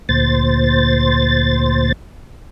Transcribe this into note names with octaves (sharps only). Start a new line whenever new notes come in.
D2 A#2 C5 A6